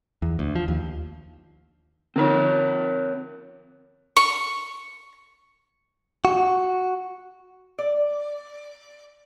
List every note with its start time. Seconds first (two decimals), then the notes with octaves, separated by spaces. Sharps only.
0.22 E2
0.39 D2
0.56 F3
0.68 D#2
2.16 D3 C4 D#4 A#4 C#5
4.17 C#6
6.25 F#4
7.79 D5